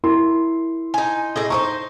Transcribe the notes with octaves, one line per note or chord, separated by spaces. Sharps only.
E4 A#4 C6
D#4 G#5
A2 G#4 D#5
D#4 G#4 C5 C#6